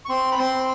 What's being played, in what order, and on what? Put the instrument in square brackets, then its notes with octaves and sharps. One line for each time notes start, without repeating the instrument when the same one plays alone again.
[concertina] C#6
C4 C6
B5
C4 C6